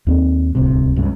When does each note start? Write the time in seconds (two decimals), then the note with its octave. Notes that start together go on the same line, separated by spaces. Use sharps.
0.07 D#2 C4
0.55 D1 C2 C3
0.96 C#2 G2 C#3